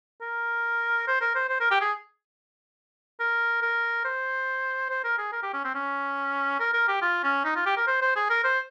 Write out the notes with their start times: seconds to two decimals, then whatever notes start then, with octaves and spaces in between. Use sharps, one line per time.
0.21 A#4
1.07 C5
1.21 A#4
1.35 C5
1.49 C5
1.60 A#4
1.71 G4
1.81 G#4
3.20 A#4
3.62 A#4
4.05 C5
4.90 C5
5.04 A#4
5.18 G#4
5.32 A#4
5.43 G4
5.54 C#4
5.64 C4
5.75 C#4
6.60 A#4
6.74 A#4
6.88 G4
7.02 F4
7.23 C#4
7.45 D#4
7.56 F4
7.66 G4
7.77 A#4
7.87 C5
8.01 C5
8.16 G#4
8.30 A#4
8.44 C5